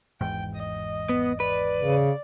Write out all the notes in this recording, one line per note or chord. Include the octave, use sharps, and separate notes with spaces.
G#1 E2 G#2 G5
D#5
B3
B4 D5
C#3